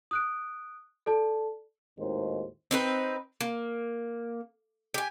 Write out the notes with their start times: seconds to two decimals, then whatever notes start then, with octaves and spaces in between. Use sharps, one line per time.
0.11 D#6 F#6 D7
1.06 A4 D5 A5
1.99 G#1 D#2 A2 D#3 G#3 C5
2.71 C4 D#4 B4
3.41 A#3
4.94 G4 G#5